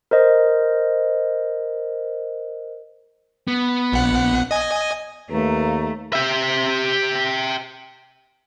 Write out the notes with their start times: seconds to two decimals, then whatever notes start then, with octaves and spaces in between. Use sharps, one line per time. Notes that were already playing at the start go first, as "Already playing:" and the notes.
0.11 A#4 C5 D#5
3.48 B3
3.93 A#1 F#5
4.51 D#5 G#5
5.30 D#2 A3 B4 F5 A#5
6.13 G4 E5